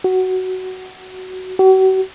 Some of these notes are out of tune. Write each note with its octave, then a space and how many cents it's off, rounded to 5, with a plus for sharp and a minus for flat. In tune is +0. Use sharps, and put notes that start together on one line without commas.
F#4 +10
F#4 +40